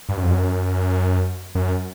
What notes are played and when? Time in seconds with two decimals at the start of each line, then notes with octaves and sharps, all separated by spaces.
0.09 G2
0.17 F#2
0.23 F2
0.32 F#2
1.55 F#2